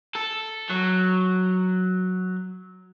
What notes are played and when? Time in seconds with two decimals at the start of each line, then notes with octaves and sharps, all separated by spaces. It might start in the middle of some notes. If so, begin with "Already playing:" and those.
0.15 A4
0.70 F#3